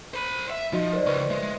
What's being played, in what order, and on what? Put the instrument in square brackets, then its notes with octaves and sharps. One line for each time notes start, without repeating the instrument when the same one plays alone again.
[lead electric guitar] C5 B5
E5
[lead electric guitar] F3 [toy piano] D#4 F#4 D#5
[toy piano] A#4 C5 D5
[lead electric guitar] C#2 [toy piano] B4 C#6
[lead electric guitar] G#3 [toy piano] E5